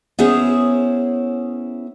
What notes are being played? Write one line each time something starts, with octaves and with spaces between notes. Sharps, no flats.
B3 C#4 E4 G#4 C5 C#5